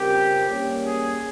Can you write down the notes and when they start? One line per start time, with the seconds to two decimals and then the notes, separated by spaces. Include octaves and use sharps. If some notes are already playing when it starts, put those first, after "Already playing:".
Already playing: C#3 G3 C4 F4 G4 A#4
0.47 G3 A#3 C#4
0.85 G#4